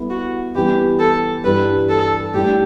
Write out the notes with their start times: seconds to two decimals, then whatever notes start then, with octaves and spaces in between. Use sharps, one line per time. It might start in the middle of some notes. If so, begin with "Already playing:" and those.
Already playing: G3 B3 E4 A4
0.10 F#4
0.55 E3 G3 B3 G4
0.99 A4
1.44 G2 E3 G3 D4 G4 B4
1.90 A4
2.34 A2 G3 D4 G4